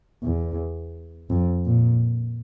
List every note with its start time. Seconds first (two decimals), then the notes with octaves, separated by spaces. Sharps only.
0.23 E2
1.30 F2
1.66 A#2